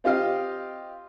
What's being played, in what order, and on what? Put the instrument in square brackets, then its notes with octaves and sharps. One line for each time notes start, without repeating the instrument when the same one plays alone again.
[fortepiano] C4 F4 G4 D#5 F5